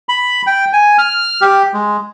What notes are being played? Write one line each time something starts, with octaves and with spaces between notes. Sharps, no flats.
B5
G5
G#5
F6
G4
G#3